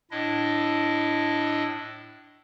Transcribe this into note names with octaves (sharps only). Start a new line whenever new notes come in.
A2 D4 E4 D#5